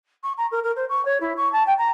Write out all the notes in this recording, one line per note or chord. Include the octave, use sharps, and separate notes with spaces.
C#6
A#5
A#4
A#4
C5
C#6
C#5
E4
C#6
A5
G5
A#5